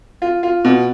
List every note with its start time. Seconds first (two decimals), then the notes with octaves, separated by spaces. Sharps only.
0.22 F4
0.43 F4
0.65 B2